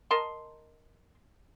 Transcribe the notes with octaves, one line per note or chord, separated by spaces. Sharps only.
A#4 D#5 A5 C6